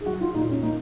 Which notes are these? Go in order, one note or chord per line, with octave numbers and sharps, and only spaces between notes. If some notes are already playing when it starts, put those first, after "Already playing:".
G#4
F#3 F#4
F4
A#2 D#4
C#4
A#3 D#4